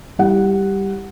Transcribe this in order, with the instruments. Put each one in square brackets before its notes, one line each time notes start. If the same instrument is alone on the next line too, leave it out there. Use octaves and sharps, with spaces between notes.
[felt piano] G3 E4 F#5